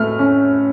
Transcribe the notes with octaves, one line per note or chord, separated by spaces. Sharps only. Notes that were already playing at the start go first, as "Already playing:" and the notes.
Already playing: A2 A3 F6
C#4